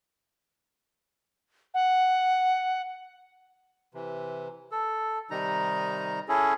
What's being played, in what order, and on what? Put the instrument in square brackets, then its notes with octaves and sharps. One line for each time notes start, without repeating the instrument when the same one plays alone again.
[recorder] F#5
[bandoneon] C3 E3
A4
C3 D#3 G3 D#4 A#5
C#4 E4 G#4 A4